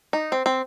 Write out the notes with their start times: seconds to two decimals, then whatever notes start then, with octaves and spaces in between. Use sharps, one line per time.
0.13 D#4
0.32 C4
0.46 C4